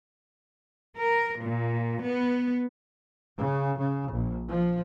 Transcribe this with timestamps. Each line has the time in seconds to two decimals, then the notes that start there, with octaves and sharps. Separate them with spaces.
0.99 A#4
1.41 A#2
2.04 B3
3.37 C#3
3.78 C#3
4.12 A#1
4.47 F3